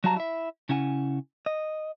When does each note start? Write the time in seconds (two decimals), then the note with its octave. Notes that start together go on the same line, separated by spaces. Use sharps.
0.04 F#3 G3 F#4 F5 A5 A#5
0.16 E4 E5
0.69 C#3 C#4 E4 F#5 G#5
1.46 D#5